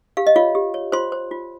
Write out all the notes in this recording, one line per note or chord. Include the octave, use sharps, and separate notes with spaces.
G4 F5
D#5
F4 C#5 F5
G4
C#5
F4 C5 C6
C5
F4